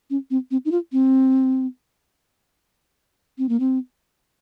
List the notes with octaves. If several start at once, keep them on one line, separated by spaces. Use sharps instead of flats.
C#4
C4
C4
D#4
F4
C4
C4
A#3
C4